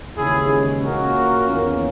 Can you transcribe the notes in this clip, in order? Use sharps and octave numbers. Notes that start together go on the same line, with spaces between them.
D#2 C#3 E3 G#3 C#4 E4 G#4
A#2 A#3 C#4 F#4 A#4
E2 D#3 A#3 C#4